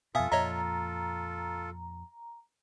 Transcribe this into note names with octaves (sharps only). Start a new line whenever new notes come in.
F2 B2 F4 A4 E5 F5 G#5 D#6
F2 A#2 C#5 D#5 E5 A#5